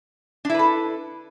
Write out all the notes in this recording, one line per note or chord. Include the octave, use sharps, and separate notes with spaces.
D4 E4 A4 B4